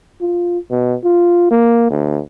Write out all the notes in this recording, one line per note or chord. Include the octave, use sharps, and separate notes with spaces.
F4
B2
F4
A#3
D2